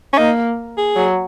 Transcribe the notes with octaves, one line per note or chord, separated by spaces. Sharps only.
C#4
A#3 D#4
G#4
F#3